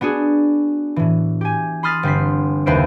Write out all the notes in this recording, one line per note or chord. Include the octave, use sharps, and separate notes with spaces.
B3 D4 F#4 G#4
A2 E3
G4 G#5
B5 C6 D#6 F6 A6 B6
G1 C4 C6 B6
F#1 D#2 B4 C5 E5 D7